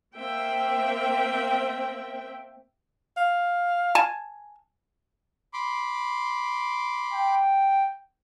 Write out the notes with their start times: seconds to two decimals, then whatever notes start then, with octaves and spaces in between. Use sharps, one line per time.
0.17 A#3 C4 E5 G5
3.17 F5
3.95 G#5 A5
5.54 B5 C6 D6
7.13 G5